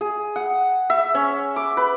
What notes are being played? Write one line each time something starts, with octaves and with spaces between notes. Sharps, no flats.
G#4
F#5
E5
C#4
D6
B4